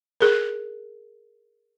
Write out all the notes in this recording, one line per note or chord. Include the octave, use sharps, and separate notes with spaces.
G#4 A#4